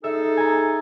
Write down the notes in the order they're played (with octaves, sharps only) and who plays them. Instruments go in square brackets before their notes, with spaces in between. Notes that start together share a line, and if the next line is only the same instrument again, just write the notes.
[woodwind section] D#4 G#4 A4 [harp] E5
[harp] G#5 A#5